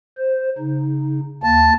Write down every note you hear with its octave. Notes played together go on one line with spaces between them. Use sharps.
C5
C#3 D#4
D#2 A#3 A5